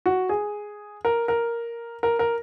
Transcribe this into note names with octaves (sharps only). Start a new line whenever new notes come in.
F#4
G#4
A#4
A#4
A#4
A#4